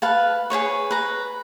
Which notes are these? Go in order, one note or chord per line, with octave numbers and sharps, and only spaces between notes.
B4 F5 A5
G#4 B4 C#5 C#6
B4 A#5